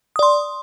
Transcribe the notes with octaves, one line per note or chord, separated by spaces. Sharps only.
D5 C6 D#6